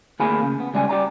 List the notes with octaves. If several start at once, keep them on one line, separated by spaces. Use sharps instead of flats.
D2 A#3 G#4 G#5 B5
C#3
B3
C#2 G3 C#5 G#5
G4 D5 A#5